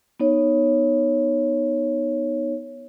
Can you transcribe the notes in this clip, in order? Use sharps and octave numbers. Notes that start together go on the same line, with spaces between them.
B3 D#4 C#5